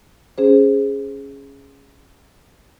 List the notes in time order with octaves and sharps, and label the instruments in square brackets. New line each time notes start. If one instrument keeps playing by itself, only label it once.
[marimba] C#4 G#4 C5